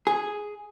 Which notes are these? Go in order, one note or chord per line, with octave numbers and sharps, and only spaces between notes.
G#4